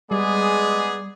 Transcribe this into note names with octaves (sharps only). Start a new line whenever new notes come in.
G3 G#3 B3 G#4 D5